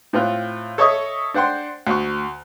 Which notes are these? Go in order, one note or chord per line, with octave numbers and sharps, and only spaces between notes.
A2 C4 F4 F#6
A4 C#5 D#5 E5 C#6 D#6
D4 C5 F#5 G5 C6
D2 C#6